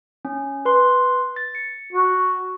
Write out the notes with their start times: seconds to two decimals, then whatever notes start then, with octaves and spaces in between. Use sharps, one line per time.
0.25 C#4
0.65 B4 C6
1.36 A6
1.55 C#7
1.93 F#4